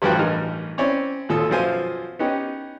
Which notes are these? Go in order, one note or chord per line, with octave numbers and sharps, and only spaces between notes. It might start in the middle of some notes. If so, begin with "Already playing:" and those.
A1 G2 F3 F#4 B4 G5
A1 G2 D#4 A#4 F6
C4 C#4 E4 C#5 D5
G#1 D#2 A#2 A4 D#6 E6
F#2 B2 F3 F4 C5 G#5
B3 C#4 D#4 G4